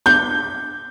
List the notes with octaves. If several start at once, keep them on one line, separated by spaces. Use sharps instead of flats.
G6